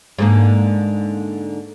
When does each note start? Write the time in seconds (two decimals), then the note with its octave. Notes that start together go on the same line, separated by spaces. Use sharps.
0.18 G#2 D3 A#3